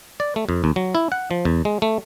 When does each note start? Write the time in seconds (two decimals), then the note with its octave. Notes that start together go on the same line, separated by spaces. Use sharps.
0.20 D5
0.36 A3
0.49 F2
0.64 D#2
0.76 F#3
0.95 E4
1.12 F#5
1.31 F3
1.45 E2
1.65 G#3
1.82 A3